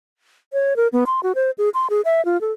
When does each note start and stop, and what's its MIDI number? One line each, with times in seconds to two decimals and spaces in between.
0.53 0.76 73
0.76 0.88 70
0.93 1.04 59
1.06 1.20 84
1.23 1.32 66
1.35 1.51 72
1.58 1.69 68
1.74 1.88 84
1.90 2.01 68
2.05 2.24 76
2.25 2.40 65
2.41 2.52 69